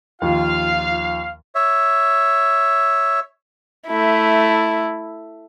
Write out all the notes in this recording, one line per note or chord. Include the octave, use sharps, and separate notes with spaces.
D#2 F3 F4 F5
C#5 E5
A3 E4